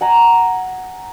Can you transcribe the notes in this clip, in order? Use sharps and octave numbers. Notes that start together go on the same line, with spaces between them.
F#5 G#5 A#5